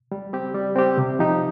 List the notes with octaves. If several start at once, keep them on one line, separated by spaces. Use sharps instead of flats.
G3
C4 G4
G3
C4 G4
C3
F3 D#4 G4